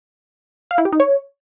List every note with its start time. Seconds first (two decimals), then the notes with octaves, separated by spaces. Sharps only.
0.71 F5
0.78 E4
0.85 G4
0.92 D#4
1.00 C#5